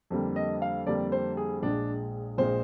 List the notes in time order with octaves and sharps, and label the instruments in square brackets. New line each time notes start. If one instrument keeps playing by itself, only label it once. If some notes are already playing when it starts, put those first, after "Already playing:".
[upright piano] F2 D3 G3 A#3
D#5
F5
F2 D3 G3 A#3 D5
C5
G#4
A#1 A#2 G#3 D4
A#1 A#2 G#3 C5